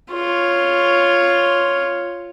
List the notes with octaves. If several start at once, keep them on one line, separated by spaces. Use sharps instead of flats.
F4 C#5